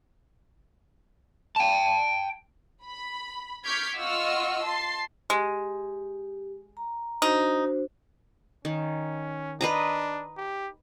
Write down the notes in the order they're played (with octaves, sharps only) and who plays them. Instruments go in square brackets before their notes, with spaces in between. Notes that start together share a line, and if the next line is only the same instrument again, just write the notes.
[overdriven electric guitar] G5 A5
[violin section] B5
C#6 D6 F6 G6 G#6 B6
F4 D#5 F#5 C#6 E6 F6
A5 C6 C7
[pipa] G#3 [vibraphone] G4
[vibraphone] A#5
[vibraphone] D4 F#4 C5 [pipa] D#4
[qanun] D#3 [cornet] C#4
[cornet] D4 [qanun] B4 D#5 A#5
[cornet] G4